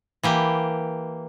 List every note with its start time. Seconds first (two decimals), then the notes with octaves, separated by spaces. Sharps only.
0.23 E3 A#3 G4